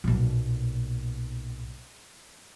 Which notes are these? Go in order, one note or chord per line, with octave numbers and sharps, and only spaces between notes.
B1 A#2